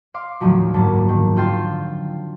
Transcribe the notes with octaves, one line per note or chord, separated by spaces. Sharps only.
F5 C6 D6
D#2 A2 D3 D#3 F3 F#3
F#1 D2 G#2 A#3 A5
D#3
D3 C4 F4 G5 C6 A6